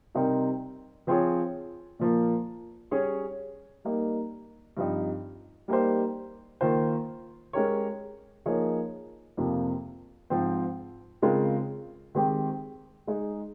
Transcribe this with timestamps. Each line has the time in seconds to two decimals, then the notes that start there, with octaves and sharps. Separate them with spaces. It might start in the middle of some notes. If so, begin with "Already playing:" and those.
0.15 C3 G3 C4 D#4 A#4
1.07 F3 C4 F4 G#4 C#5
1.99 A#2 F3 A#3
2.91 G3 C#4 G#4 C#5
3.85 G3 A#3 D#4
4.77 G2 F3 C4 D#4
5.68 G3 A#3 D#4 G4 C5
6.61 D#3 A#3 F4 C5
7.53 G#3 C#4 G4 A#4 C#5
8.46 F3 A#3 D#4 G#4 C#5
9.37 F2 C3 F3 A#3
10.30 G#2 F3 C4
11.22 C#3 G#3 C4 F4 A#4
12.15 D#3 G#3 C4 G4
13.07 G#3 D#4 G#4